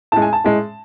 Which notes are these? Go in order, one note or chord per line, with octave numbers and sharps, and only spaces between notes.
A2 G#3 A5
G#5
A5
A2 G#3